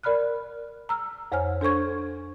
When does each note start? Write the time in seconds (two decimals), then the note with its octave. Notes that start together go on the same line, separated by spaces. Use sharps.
0.03 A#4 D5 B5 F6 F#6
0.89 A#5 E6 F6
1.32 F2 C5 C#5 G#5 F6
1.61 D4 A4 C5 C#6 G#6